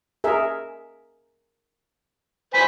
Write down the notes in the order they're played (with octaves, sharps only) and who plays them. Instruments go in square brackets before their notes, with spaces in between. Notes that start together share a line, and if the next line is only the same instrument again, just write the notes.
[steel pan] G#4 A#4 E5
[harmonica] B4 C5 G#5 [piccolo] B6